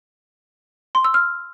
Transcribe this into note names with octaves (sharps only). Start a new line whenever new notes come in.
C6
E6
F6